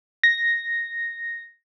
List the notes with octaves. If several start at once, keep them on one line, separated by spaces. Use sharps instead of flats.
A#6